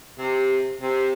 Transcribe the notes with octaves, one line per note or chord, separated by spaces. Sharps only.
C3
C3